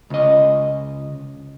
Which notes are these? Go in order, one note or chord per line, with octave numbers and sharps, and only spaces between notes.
C#2 D#5